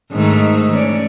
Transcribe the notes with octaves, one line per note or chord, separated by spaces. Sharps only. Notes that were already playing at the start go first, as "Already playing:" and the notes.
G#2 D#3 A3
E3 C#4 D5